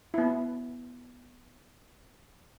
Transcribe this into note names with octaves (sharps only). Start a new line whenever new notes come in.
B3 E4